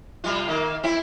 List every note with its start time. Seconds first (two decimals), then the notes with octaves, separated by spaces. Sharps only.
0.24 C3 G3 F4
0.48 D#3 A#3
0.83 C4 E4